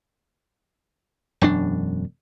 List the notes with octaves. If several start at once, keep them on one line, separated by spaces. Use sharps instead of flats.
E1 F#2 D4